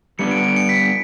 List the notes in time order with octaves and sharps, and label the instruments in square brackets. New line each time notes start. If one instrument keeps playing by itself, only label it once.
[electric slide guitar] G3 B3 D4 [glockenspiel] C#7
[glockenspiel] D7
D7
C#7
B6